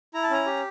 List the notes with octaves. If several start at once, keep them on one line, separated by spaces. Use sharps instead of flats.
E4 A#5
A5
C#4 A#5
G4